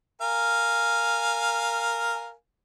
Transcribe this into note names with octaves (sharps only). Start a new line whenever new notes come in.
A#4 F5 G#5